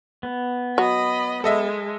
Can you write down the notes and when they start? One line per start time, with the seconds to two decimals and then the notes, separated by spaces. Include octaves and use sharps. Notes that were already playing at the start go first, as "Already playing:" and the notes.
0.23 B3
0.78 F#3 D#5 B5
1.44 G#3 A4 D#5 E5